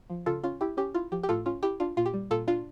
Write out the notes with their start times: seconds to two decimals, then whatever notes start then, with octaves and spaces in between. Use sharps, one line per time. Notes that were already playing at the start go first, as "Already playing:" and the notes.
0.10 F3
0.26 C#3 F4 A4
0.44 C#4 F4
0.61 E4 G4
0.77 C#4 G4
0.95 E4 F4
1.12 F3 G4
1.23 G4
1.29 A2 F4 A4
1.46 C#4 F4
1.63 E4 G4
1.80 D4 F4
1.97 A#2 F4
2.06 G4
2.14 G3
2.31 A#2 F4 A4
2.48 D4 F4